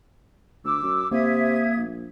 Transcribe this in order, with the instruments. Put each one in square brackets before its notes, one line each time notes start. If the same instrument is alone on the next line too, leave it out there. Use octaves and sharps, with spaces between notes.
[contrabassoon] D2 [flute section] D6 E6
[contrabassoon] F#2
[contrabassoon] C3 [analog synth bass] A#3 [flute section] E5 D#6 G#6
[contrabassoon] A#1